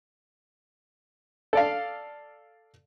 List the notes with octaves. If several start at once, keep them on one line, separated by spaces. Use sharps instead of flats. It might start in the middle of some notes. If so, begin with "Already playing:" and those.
A4 D5 F5